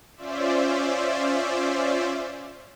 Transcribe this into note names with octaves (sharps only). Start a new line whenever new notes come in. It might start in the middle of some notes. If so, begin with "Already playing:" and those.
C#4 F4 C5 D5 E5